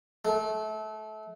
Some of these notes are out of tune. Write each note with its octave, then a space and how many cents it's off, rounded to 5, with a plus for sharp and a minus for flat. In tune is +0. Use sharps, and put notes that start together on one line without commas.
A3 -30